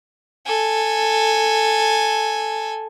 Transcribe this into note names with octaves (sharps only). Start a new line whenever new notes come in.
A4 G#5